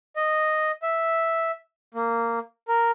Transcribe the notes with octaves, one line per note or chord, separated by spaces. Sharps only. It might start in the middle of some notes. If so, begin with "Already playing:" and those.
D#5
E5
A#3
A#4